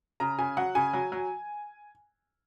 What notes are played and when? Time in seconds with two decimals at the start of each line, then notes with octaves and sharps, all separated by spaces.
0.20 C#3 A#5
0.39 C#3 G#5
0.57 F#3 F#5
0.75 C#3 G#5
0.93 F#3
1.12 F#3